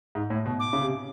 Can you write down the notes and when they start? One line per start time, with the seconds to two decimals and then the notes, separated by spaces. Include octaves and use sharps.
0.15 G#2
0.30 A2
0.46 B2
0.60 D6
0.73 C#3
0.82 C3